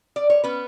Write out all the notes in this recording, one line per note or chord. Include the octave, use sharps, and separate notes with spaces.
D5
C#5
B3 C#4 B4